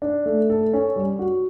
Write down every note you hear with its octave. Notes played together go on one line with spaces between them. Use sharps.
D4
A3
A4
C#4
G3
F#4